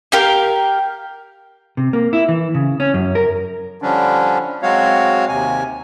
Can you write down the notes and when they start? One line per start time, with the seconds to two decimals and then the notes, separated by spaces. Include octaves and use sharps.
0.12 G4 A#4 F5
1.77 C3
1.93 A#3
2.13 E4
2.29 E3
2.55 C#3
2.80 C#4
2.94 F#2
3.15 A#4
3.82 D3 F3 G3 C#4 D4
4.62 F#3 G#3 C4 F#4 C#5 F5
5.28 D#2 C3 G#5